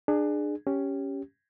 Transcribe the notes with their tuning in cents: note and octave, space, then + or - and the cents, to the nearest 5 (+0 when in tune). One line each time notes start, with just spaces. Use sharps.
D4 +25 G#4 +0
C#4 +5 G4 +0